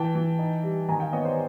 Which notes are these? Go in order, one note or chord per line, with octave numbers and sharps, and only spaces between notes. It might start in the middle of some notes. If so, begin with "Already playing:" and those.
Already playing: E3 G5 A5
E3
D#4
G3
D#3 G#5 A#5
F5 G5
B3 C#5 D#5
C5 D5